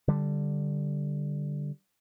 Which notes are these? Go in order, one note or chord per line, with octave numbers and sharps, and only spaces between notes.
D3 G3